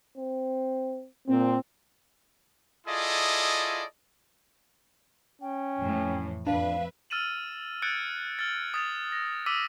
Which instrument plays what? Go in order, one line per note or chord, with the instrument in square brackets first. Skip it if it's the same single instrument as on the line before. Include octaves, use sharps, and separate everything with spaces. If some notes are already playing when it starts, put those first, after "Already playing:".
[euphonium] C4
[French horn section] A#2 C4
[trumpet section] E4 F4 G#4 A4 D5 D#5
[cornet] C#4 [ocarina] G5
[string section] F2 A2 E3
[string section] F2 B4 E5 [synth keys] D4 [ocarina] F5
[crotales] E6 F6 A6 D#7 E7 F#7
E6 F#6 G#6 A6 C#7 D7
F6 A6
D#6 A6 F7
A#6
D6 E6 F6 B6 D#7 E7